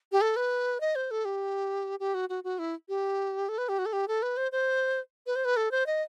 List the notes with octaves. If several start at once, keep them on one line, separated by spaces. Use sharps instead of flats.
G4
A4
B4
D#5
C5
A4
G4
G4
F#4
F#4
F#4
E4
G4
A4
B4
G4
F#4
A4
G4
A4
B4
C5
C5
B4
C5
B4
A4
C5
D#5